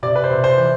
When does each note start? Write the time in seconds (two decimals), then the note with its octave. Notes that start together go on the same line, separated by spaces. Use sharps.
0.03 C3 D5
0.16 B4
0.24 C5
0.30 C3
0.44 C5
0.57 E3